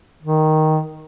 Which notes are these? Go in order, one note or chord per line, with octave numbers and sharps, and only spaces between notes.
D#3